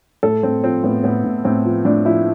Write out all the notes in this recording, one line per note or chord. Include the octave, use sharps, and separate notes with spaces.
A2 A4
A2 C4
F3 C4
A2 B3
A2 B3
A2
A2 C4
F3
A2 D4
F3 E4